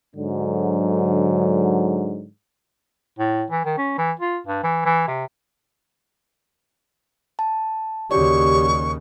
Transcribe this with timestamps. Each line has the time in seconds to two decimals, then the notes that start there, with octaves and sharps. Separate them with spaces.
0.15 G#2 D3 F#3
3.19 A2
3.50 E3
3.65 D#3
3.78 C#4
3.98 E3
4.19 F4
4.47 G2
4.63 E3
4.85 E3
5.08 C3
7.39 A5
8.11 D#2 C#3 F#4 G4 C#5 D5 C#6